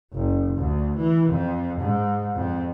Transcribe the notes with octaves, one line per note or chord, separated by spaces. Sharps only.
F#1
D2
E3
F2
G#2
F2